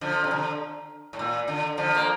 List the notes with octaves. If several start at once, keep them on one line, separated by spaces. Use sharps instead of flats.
D3 F3
C3
D3
A2
A#2
D3
D3 F3
A#3